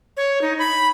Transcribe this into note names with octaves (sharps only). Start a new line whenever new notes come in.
C#5
D#4
B5